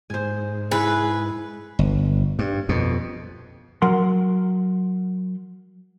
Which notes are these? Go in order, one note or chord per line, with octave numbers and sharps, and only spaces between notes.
G#2 C5 G#5
E4 G#4 B4 C#6
G1
G2
F2 B2
F#3 A#4 F#5 C6